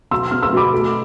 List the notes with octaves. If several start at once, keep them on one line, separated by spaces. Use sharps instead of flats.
B2 C6 E6
B3 F6
C6 E6
B2 B5 D6
A3